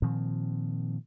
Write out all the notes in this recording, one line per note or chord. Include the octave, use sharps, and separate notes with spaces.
A#2 D#3 F3 C4